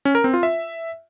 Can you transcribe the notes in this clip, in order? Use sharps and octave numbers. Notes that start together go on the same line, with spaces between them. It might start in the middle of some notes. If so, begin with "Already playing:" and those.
C#4
A#4
C4
F4
E5